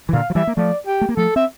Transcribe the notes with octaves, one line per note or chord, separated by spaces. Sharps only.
E3
A#2 D3 F5
F3
E3 G3 E5
A#3
F3 A3 D5
G4
A3
A#3
F3 A3 A4
C4 E5